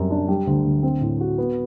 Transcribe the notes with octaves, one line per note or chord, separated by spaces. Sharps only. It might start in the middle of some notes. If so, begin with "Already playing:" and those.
Already playing: F#2 G3 C4
D4
G3
D2
D2
C4
A2
F#4
B3